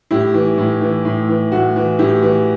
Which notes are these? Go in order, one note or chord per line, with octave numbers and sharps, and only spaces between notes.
A2 E4 G4
E3
A2
E3
A2
E3
A2 F#4
E3
A2 E4 G4
E3